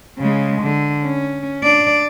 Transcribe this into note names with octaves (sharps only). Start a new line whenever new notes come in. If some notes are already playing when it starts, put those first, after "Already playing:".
C#3 G#3
D3
C#4
D4 D5